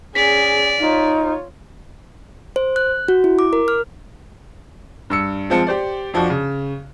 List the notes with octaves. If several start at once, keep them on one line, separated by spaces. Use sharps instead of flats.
C#4 G#4 D5 B6
D#4 F4 C#5
C5
F#6
F#4
E4
D6
A#4
F6
G2 E6 C#7
F3 G#3 C4 F4 A5 C#7
G4 C5 D5
F2 F3 D4 F#4
C#3